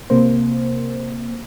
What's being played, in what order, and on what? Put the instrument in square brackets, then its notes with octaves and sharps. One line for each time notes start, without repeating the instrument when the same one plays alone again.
[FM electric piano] C3 A#3 C5